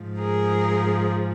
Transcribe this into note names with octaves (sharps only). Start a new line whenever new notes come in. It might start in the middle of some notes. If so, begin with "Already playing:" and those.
Already playing: G#2 F3
G#4 A#4